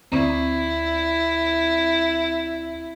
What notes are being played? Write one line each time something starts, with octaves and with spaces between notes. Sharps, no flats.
D2 C4 E4